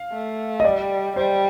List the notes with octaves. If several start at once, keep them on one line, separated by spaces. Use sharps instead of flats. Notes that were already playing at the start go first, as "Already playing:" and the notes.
Already playing: F5
A3
D#5
G3 D5
G3 C5